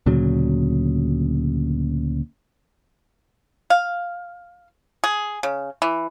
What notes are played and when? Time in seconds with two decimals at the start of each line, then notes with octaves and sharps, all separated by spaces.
0.06 D2 A#2 C#3 F#3
3.70 F5
5.04 G#4
5.43 C#3
5.82 E3